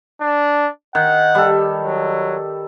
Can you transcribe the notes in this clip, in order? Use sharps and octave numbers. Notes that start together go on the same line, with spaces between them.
D4
D#3 F#5
G3 A4
F#3